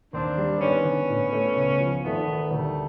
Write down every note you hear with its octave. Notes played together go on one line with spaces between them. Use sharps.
D#2 C4 D4
G3
G#1 B3 C#4
D3
A2
A3
C#2
F3
G#1 A3 B3
D#3
D2 G3 A3